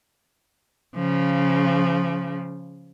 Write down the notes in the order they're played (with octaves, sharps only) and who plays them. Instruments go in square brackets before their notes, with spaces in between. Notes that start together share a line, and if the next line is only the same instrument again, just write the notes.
[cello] C#3 F3